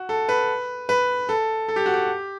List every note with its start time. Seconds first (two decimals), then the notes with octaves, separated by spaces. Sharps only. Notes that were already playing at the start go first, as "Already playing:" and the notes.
Already playing: F#4
0.09 A4
0.29 B4
0.89 B4
1.29 A4
1.68 A4
1.76 G4
1.86 F#4
1.94 G4